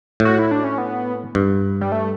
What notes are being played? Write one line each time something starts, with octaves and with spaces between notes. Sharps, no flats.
A2
F#4
E4
D4
C#4
B3
G2
G3
A3